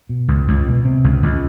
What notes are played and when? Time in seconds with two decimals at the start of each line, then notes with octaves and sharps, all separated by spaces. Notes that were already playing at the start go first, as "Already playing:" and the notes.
0.09 B2
0.28 C#2
0.48 C#2
0.66 B2
0.85 C3
1.04 C#2
1.22 C#2